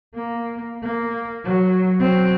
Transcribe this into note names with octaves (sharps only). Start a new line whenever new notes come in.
A#3
A#3
F#3
F#3 C4